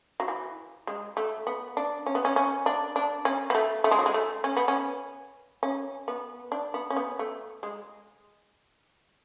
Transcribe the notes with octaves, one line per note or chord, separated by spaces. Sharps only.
F#3
E3
G#3
A3
B3
D4
C#4
B3
C#4
C#4
D4
D4
C#4
B3
A3
A3
G#3
F#3
G#3
A3
C#4
B3
C#4
C#4
B3
D4
B3
C#4
B3
A3
G#3